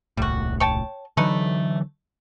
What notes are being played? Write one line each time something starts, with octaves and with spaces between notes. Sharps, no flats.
D#1 C2 A2 G3 F#4
C#5 G5 A5
D3 E3 F#3 A3 D#4 B4